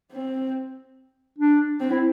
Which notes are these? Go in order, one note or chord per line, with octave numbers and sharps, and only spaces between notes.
C4
D4
C4
E4